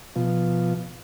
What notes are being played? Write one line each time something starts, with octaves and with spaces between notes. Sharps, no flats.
B2 F3